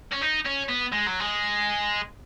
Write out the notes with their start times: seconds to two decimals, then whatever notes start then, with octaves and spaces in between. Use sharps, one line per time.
0.12 C#4
0.21 D#4
0.45 C#4
0.69 B3
0.93 G#3
1.06 F#3
1.20 G#3